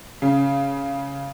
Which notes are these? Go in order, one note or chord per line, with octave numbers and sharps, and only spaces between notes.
C#3